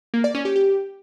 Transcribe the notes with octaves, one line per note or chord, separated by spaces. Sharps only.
A#3
D5
C#4
G4
G4